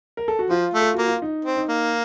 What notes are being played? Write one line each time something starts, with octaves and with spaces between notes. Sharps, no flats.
A#4
A4
F#4
F3 F4
A3
A4
A#3 F#4
F4
D#4
C4
D#4
A#3